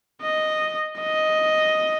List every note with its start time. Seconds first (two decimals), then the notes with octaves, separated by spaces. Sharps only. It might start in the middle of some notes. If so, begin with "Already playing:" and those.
0.22 D#5
1.00 D#5